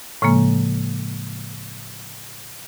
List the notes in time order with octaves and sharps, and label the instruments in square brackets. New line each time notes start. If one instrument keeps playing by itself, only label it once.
[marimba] A2 C#3 F3 G#3 A#3